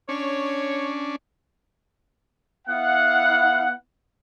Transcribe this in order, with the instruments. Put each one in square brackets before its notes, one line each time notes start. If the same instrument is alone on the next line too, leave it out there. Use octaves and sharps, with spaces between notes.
[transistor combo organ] C#4 D4 [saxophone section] C#5
[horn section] B3 E4 F5 F#5